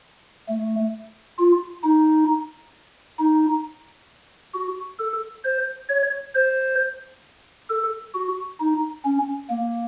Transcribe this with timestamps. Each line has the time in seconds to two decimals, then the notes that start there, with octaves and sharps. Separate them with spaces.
0.48 A3
1.39 F4
1.83 D#4
3.19 D#4
4.54 F#4
4.99 A4
5.44 C5
5.89 C#5
6.35 C5
7.70 A4
8.15 F#4
8.60 D#4
9.05 C#4
9.50 A#3